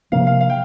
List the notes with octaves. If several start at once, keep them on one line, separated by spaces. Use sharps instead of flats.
C3 F3 A#3 D4 F5
F5
F5
G5